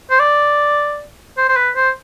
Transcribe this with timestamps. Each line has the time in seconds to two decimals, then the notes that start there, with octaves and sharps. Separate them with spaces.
0.11 C5
0.20 D5
1.38 C5
1.49 C5
1.57 B4
1.76 C5